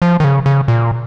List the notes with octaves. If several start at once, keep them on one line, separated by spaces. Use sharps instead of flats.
F3
D#3
C#3
C#3
A#2